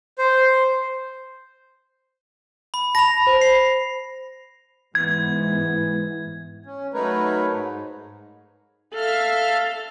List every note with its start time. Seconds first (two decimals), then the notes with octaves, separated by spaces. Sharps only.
0.18 C5
2.74 B5
2.95 A5 B5 A#6 F7
3.27 C5
3.41 C7
4.95 G#2 E3 G#3 B3 G#6
6.64 C#4
6.94 F#3 A3 D#4 A#4 B4 C#5
7.52 G#2
8.94 A4 E5 F5 F6